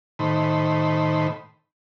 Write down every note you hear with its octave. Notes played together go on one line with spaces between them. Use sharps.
A2 D#3 C5 B5